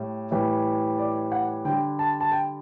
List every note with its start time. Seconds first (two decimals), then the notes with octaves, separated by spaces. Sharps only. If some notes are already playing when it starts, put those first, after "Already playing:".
Already playing: A2 G3
0.31 A2 E3 G3
0.99 D5
1.32 F#5
1.65 D3 G3 G5
1.99 A5
2.21 A5
2.32 G5